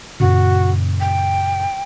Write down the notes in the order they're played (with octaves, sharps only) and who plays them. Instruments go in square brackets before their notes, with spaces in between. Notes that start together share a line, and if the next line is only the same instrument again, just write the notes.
[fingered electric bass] F#2 A#2 C#3 [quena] F#4
[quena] G5